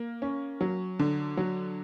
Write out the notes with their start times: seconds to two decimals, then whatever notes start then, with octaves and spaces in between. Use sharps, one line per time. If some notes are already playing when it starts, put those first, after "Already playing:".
Already playing: A#3
0.22 C#4
0.61 F#3
0.99 D3
1.37 F#3